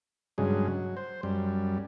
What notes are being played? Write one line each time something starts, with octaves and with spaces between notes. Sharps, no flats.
G2 C#3 F#3 G#3
F#3
C5
F#2 G3